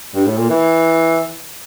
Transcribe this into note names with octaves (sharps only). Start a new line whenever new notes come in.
G2
A2
A#2
E3